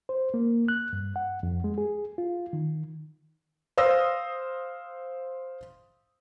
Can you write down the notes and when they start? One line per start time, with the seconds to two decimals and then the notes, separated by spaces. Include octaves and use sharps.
0.09 C5
0.34 A#3
0.68 F#6
0.93 G2
1.16 F#5
1.43 F2
1.64 G#3
1.78 G#4
2.18 F4
2.53 D#3
3.78 C5 F5 D#6 E6 A#6